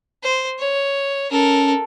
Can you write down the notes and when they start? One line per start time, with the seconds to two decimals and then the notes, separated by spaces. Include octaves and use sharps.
0.23 C5
0.58 C#5
1.31 C#4 A4 A#4